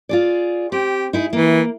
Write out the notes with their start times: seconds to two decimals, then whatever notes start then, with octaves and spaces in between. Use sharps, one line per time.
0.09 F4 G#4 D5
0.72 C4 G4
1.13 D#4 E4 G#4
1.33 E3 A#3